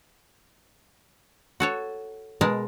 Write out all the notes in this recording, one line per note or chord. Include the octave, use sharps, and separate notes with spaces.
F#4 A4 C#5
B2 G#3 A#4 A5